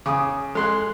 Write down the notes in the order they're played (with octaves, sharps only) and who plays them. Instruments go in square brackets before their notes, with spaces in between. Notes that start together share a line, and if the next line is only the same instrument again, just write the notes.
[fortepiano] C#3 D#6 [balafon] D6
[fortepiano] G#3 C6 F#6 [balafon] A4